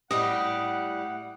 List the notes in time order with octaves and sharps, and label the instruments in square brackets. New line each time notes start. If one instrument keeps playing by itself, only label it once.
[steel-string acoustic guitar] A2 G3 G4 [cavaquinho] D#5 [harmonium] F#5